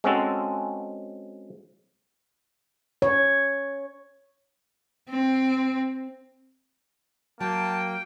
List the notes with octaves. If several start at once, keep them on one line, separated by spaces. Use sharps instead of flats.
G#3 C4 C#4 F#4 A4
C#5
C4
F#3 A#3 G5 A5